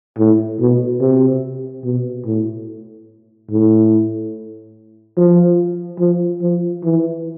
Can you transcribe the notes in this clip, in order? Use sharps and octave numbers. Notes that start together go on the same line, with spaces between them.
A2
B2
C3
B2
A2
A2
F3
F3
F3
E3